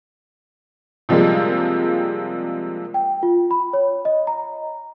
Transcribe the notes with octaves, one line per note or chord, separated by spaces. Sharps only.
C3 F3 G3 G#3 A#3
G5
F4
B5
C#5
D#5
A#5